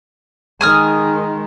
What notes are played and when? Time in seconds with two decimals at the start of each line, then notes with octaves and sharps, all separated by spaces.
0.61 D#3 G#3 G#5 D#6 F6